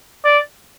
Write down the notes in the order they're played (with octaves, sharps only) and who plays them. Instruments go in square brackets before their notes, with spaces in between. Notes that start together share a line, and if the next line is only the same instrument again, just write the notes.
[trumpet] D5